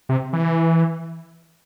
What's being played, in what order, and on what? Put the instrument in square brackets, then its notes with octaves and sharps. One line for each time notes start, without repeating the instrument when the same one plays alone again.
[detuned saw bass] C3
E3